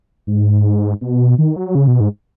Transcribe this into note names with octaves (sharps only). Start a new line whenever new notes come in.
G#2
B2
D#3
F#3
C#3
B2
G#2